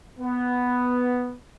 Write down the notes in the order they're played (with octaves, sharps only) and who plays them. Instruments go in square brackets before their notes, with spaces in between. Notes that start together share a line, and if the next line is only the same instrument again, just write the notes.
[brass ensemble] B3